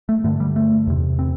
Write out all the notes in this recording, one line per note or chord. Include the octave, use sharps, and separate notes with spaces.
A3
G2 D3 A3
G3
A3
E2 C3
C4